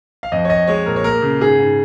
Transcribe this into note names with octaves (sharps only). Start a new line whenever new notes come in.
F5
F2 D#5
C#5
F2 D#5
G#3 C#5
A#2 A#4
C#5
A#3 A#4
C#3
G#2 G#4
G#2